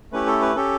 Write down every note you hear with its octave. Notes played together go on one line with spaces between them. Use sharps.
A3 C#4 E4 G4 B4
A4
B4
C#4 G4 A4